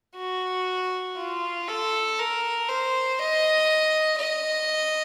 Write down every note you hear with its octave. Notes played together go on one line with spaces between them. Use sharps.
F#4
F4
A4
A#4
C5
D#5
D#5